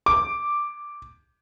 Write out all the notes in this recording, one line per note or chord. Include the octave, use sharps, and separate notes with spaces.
D6